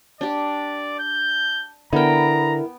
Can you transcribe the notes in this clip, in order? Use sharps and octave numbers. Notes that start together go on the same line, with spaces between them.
D4 G4 D5
G6
D3 B3 E4 A#4 G5 A#5